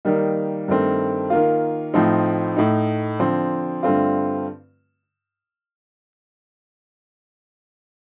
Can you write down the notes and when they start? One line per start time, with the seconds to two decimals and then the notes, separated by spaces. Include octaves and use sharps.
0.05 D#3 G3 A#3 D#4
0.68 G2 D#3 A3 C4
1.30 D#3 A#3 F4
1.94 A2 F3 C4 D#4
2.57 A2 A3 D#4
3.20 D3 F3 C4
3.83 G2 D3 A3 C4 F4